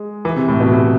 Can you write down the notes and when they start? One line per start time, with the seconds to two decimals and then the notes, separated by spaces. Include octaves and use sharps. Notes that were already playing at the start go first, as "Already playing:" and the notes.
Already playing: G#3
0.25 E3
0.36 C3
0.48 A2
0.60 B2
0.72 C3